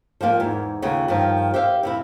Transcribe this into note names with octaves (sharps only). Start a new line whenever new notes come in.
F3 G3 A#3 F4
E2 G#2
D#2 C#3 A3 F4 F#5
G2 D#3 F3
G4 C5 E5 F5
F2 C3 E4